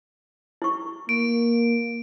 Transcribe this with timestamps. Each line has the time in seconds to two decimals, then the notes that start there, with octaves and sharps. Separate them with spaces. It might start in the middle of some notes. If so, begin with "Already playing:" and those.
0.62 E4 C#6
1.09 A#3 D7